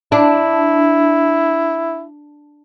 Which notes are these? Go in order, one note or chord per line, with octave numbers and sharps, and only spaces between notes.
D4 E4